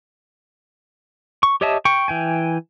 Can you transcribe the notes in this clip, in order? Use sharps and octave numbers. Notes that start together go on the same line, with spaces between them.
C#6
G4 C#5 D#5 E5 A5
G5 C#6
E3 G5 G#5